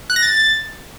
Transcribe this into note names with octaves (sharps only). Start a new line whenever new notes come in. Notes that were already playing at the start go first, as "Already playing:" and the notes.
F#6
A#6
A6